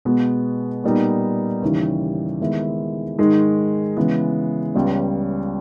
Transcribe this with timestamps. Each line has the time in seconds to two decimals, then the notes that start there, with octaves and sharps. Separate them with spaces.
0.05 B2 G#3 B3
0.84 A#2 G3 B3 D#4
1.62 D#2 C#3 E3 G3
2.40 D#2 D#3 G#3 B3 E4
3.18 G#2 D#3 G#3
3.97 C#3 E3 G#3 B3
4.74 C#2 C#3 G3 B3